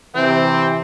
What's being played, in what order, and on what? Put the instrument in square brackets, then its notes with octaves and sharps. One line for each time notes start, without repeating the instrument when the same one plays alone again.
[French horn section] C3 E3 [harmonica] C4 G5